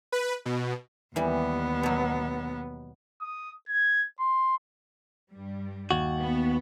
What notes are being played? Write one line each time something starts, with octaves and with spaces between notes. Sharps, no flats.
B4
B2
D#2 E3 G3 B3
B2 F#3
D#6
G#6
C6
G2 G3
D#2 F#4
B3